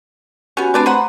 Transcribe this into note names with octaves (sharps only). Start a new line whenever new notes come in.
B3 C#4 F#4 G4 G#5
A3 C4 D4 B4 D5
B4 C5 F#5 A#5